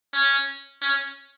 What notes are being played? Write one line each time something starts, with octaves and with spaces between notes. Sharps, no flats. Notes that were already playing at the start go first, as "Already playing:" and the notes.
C#4
C#4